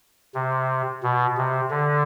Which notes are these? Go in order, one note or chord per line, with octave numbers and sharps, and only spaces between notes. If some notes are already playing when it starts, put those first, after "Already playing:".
C3
B2
C3
D3